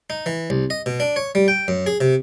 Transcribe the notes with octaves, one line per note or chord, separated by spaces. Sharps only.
D#4
E3
C2
D#5
B2
D4
C#5
G3
G5
F#2
G#4
C3